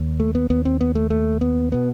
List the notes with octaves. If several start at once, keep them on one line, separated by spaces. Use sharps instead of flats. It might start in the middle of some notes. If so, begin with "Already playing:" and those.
Already playing: D#2
A3
B3
D#2 B3
C4
B3
A3
A3
B3
B2 B3